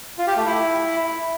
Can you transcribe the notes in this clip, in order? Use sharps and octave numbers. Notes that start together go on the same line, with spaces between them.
F4
G4
A3
E4